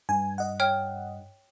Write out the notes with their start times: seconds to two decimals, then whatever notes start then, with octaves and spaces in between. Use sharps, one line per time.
0.09 G2 G#5
0.38 D#5 F#5
0.60 C#5 G5 F6